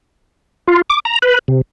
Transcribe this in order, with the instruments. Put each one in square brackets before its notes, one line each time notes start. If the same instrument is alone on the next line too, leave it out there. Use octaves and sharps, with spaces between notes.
[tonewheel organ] F4
D6
A#5
B4
C3